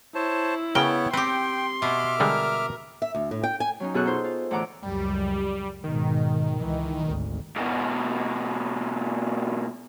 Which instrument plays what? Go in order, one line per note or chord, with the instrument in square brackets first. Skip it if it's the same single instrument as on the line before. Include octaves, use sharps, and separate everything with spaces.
[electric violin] E4 [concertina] C5 C#5 A5
[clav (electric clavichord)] C#3 A#4 [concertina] B3 C#5 [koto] G5
[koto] C4 G4 [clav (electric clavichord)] B4 [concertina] G5 [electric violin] C6
[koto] B2 [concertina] E5 D6 F6
[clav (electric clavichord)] D3 G3 G#3 [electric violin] A#4
[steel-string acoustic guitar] E5
D2
A2
G5
G#5
[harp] F#3 C#4 D#4
F#2 B2 G#4 A4 C#6 F#6
D#4 F4 C5
F4
D2 A2 E3 F#5 A#5 D6
[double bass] C#2 F#2 [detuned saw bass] G3
[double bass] G#2 B2 [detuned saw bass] D#3
[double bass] C#2 E3
G#1 D2
[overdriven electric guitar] G#2 B2